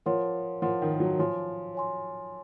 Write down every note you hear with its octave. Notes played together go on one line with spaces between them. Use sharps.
F3 A#4 C#5 F#5 C6
F3 A#4 C#5 F#5 C6
D#3
F#3
F3 C#5 G#5 C6
C#5 G#5 C6